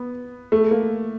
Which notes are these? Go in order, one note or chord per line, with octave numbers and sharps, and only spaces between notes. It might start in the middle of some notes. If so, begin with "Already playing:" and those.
Already playing: B3
A3
A#3